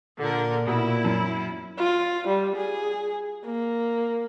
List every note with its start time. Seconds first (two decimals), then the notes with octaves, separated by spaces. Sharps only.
0.21 A#2 D3 A#4
0.67 B2 E4
1.05 F#2
1.78 F4
2.28 G3
2.56 G#4
3.46 A#3